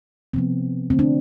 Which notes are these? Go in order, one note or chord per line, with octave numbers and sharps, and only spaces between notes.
C3 F3 B3 C4
D3 A3 C4
D4